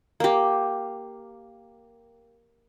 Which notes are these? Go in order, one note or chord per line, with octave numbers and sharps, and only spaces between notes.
A#3 G4